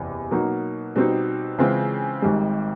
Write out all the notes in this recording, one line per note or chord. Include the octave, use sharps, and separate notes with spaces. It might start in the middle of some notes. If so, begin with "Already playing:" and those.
Already playing: F#1 E2 C3 E3
B2 F#3 A#3 D#4 F#4
B2 G3 C4 D#4
C#3 E3 G#3 C4 F4
G#1 G#2 D#3 G3